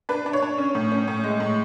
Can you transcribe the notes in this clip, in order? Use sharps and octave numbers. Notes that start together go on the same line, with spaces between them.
D4 B4
D4
C#5
D4
C#4
A2
C#4
A2
G#3
A2